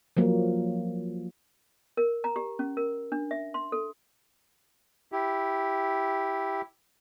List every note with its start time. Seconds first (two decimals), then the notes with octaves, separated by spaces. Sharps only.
0.17 F3 F#3 A#3
1.97 A#4
2.24 A#5
2.36 G4
2.59 C#4
2.77 A#4
3.12 D4
3.31 E5
3.54 C6
3.72 A4
5.12 E4 G4